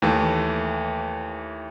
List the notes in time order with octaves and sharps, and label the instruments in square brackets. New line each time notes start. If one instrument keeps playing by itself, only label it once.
[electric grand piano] D#2 E3 A3